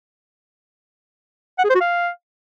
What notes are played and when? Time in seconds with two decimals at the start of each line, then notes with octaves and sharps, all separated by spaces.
1.59 F#5
1.64 G#4
1.70 C5
1.75 F#4
1.81 F5